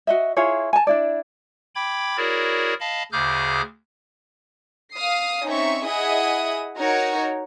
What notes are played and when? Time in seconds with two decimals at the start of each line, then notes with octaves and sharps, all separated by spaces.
0.07 F#4 D#5 E5
0.37 E4 F4 G#4 C#5
0.73 G#5 A5
0.87 D4 E4 D5
1.75 G5 B5 D6 G#6
2.17 E4 F#4 G#4 A#4 C#5 D5
2.80 D#5 F5 A5 B5
3.12 D2 C#3 G#4 D6 F6 G6
4.94 F5 D#6 C7
5.46 C4 C#4 D#4 E5 C#6
5.85 E4 G#4 D#5 E5 F#5 D#6
6.77 D#4 F#4 A#4 C#5